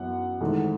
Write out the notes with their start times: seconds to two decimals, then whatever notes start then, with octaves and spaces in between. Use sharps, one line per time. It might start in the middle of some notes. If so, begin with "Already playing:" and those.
Already playing: F#2 E3 B3 F#5
0.41 G#1 G#2 E3 A3